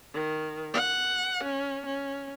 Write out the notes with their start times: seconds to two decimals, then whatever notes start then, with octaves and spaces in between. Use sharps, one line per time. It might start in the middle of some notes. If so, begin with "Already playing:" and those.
0.13 D#3
0.73 F#5
1.43 C#4
1.85 C#4